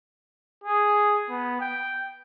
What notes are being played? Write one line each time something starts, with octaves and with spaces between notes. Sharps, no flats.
G#4
B3
G5